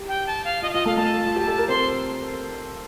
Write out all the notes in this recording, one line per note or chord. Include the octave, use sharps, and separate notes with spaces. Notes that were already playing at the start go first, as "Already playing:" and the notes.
Already playing: G4
G5
A5
F5
F4 D#5
F5
F4 D#5
A3 A4 F5
A3 A4 A5
F4
G4
A4
A#4
C4 C5 C6